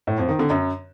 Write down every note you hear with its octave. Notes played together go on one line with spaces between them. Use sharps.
A2
F2
D#3
D3
F#2